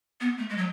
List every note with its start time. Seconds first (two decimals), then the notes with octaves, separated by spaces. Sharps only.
0.21 B3
0.38 A3
0.50 G#3
0.57 F#3